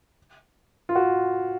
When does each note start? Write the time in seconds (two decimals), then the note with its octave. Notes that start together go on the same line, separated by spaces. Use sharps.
0.89 F4
0.95 F#4